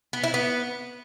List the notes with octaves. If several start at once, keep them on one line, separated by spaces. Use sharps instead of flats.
B3
E4
B3